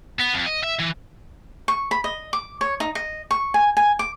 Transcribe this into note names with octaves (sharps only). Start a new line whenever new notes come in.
B3
F2
D#5
E5
E3
C#6
B5
D#5
D6
C#5
D#4
D#5
C#6
G#5
G#5
D6